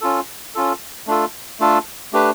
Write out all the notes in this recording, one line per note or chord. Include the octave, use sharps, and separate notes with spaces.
C#4 F4 A4
C#4 F4 A4
A3 D4 F4 A4
A3 D4 F4 A4
A3 D4 G4 B4